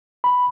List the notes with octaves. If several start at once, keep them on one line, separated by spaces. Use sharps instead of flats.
B5